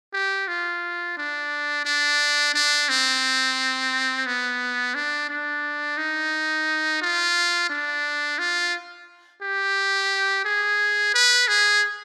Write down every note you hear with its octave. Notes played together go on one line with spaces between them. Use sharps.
G4
F4
D4
D4
D4
C4
B3
D4
D4
D#4
F4
D4
F4
G4
G#4
B4
G#4